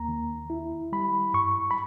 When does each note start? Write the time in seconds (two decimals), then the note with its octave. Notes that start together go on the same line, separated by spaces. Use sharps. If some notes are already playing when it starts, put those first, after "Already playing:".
Already playing: D#2 A#3 A#5
0.09 D#3
0.50 E4
0.92 G3 B5
1.34 G2 C#6
1.71 B5